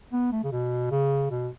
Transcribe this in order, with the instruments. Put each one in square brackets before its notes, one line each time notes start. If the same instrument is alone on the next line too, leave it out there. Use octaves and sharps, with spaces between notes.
[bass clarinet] B3
A3
C#3
B2
C#3
B2